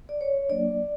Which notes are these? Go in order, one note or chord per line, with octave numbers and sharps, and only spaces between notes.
D5
C#5
F#3 A#3 D4 D5